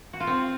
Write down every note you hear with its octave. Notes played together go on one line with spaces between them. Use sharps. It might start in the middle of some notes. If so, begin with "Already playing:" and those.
F#4
F4
C4